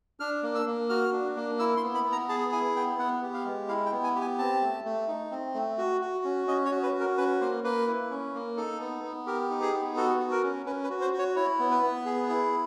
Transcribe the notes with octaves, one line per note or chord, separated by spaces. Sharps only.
D4 F6
A#3
E6
A#3
F#4 F6
D4
A#3
E4 E6
C6
B3
B5
B3
A#5
G#4 A5
E4 G#5
B3 G5
B3 F#5
G4
F5
G#3
E4 F5
G5
B3
G#5
G4
G#5
C4 A5
A3
A3
D#4
C4
A3
F#4
F#4
C#4
C#4 D#5
C#5
F#4
B4
F#4
A#4
C#4 B4
A#3 C5
A#3 B4
E4
C#4
A#3
D#4 A4
B3
B3
G4 A#4
D#4
G#4
B3
F#4 A4
F#4
A#4
C#4
C#4 B4
B4
F#4
C5
F#4
C#5
E4 C#5
B3
B4
B3
G#4
E4